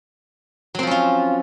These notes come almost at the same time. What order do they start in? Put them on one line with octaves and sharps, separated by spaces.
F#3 C4 F3 C#4 F4